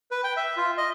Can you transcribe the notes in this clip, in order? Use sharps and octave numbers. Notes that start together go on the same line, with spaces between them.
B4
G5
E5
F4
D#5